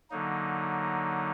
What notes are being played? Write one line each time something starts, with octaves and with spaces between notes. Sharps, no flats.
D3 F#3 A#3 D#4